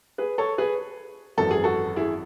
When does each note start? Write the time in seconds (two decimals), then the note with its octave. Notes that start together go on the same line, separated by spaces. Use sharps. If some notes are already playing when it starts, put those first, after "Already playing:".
0.18 G#4 B4
0.38 A4 C#5
0.58 G#4 B4
1.37 G#1 F#2 E3 A4
1.51 G#4
1.64 F#4 A4
1.96 E4 G#4